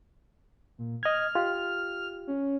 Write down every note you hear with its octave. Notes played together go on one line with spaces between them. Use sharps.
A#2
D#5 F6 G#6
F4 G4
C#4